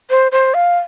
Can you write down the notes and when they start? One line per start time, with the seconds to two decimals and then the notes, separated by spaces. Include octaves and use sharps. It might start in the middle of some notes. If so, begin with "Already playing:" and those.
0.10 C5
0.32 C5
0.54 F5